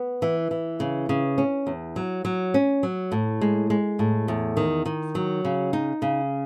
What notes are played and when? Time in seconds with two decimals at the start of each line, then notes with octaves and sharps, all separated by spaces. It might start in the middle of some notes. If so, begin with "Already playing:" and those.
Already playing: B3
0.22 E3
0.51 E3
0.80 C#3
1.09 C#3
1.38 C#4
1.67 E2
1.96 F#3
2.25 F#3
2.54 C#4
2.83 F#3
3.12 A2
3.41 G#3
3.70 G#3
3.99 A2
4.28 E2
4.57 D#3
4.86 D#3
5.15 F#3
5.45 C#3
5.73 D#4
6.02 C#3